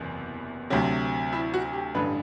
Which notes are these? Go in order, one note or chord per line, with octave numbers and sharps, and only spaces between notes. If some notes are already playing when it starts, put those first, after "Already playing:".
Already playing: F#1 E2 C3 E3
D2 C3 F#3
E4
F#4
G4
A1 G2 D3 B4